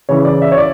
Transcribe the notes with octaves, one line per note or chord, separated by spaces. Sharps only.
C#3 E3 C#5
D5
E5
C#5
D5